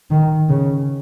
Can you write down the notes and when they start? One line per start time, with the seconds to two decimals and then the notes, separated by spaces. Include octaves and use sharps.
0.11 D#3
0.49 C#3